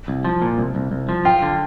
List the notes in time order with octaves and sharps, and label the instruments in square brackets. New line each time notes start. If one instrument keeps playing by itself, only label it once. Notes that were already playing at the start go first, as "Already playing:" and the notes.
[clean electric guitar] C2
F3
A#2
C2
C2
C2
F3
[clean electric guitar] F4 [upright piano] G5
[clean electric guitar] D3